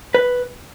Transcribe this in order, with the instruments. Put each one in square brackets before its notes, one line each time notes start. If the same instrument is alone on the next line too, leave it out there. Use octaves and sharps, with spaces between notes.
[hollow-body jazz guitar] B4